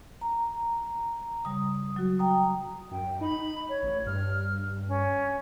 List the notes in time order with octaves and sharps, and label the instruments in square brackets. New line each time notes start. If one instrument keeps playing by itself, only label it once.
[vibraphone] A#5
[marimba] C#3 G3 [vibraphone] D#6
[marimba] F#3 F#4
[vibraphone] G5 A#5 D#6
[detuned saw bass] F#2 [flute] G5
[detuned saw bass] D#4 [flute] B5
[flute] C#5
[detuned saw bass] A1
[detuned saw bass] G2 [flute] F6
[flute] C#4